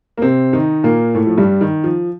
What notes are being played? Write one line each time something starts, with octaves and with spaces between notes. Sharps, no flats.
A#3
C3 C4
D#3 D#4
A#2 A#3
A2 A3
F3
G2 G3
D#3
F3